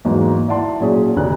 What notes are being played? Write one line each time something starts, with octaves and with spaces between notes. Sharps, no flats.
E2 G#2 F#3 A#3 D#4
E4 D5 F#5 A5 C6
A#2 F#3 C#4 G#4
F1 D2 D5 A#5 F#6